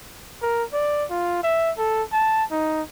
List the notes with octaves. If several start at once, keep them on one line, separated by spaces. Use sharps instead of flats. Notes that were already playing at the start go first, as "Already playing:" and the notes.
A#4
D5
F4
E5
A4
A5
D#4